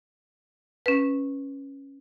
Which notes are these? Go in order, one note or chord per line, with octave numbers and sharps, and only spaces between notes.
C#4 B4